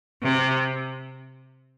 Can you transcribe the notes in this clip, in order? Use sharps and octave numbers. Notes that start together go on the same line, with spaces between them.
C3